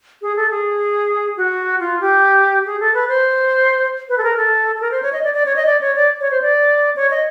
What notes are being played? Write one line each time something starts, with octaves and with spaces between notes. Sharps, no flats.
G#4
A4
G#4
F#4
F4
G4
G#4
A4
B4
C5
B4
A4
A#4
A4
A4
A#4
C5
C#5
D#5
D5
D5
C#5
D#5
D5
C#5
D5
C#5
C5
D5
C#5
D#5